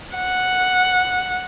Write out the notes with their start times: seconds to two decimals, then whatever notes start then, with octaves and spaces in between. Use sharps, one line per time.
0.17 F#5